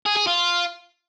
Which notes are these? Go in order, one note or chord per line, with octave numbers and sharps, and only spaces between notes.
G#4
G#4
F4